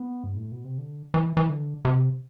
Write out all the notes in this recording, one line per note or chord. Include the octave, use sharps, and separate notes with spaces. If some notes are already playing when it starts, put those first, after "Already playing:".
Already playing: B3
G2
A2
B2
C3
D3
E3
E3
D3
C3